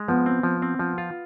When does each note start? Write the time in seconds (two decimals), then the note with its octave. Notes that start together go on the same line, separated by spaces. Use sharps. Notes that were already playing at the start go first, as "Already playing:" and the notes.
Already playing: G#3
0.08 F3 B3
0.26 C4
0.43 F3
0.62 C4
0.79 F3
0.98 F4